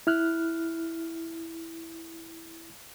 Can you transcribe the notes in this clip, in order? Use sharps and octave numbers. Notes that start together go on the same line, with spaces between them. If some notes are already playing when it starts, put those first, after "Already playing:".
E4 F6 F#6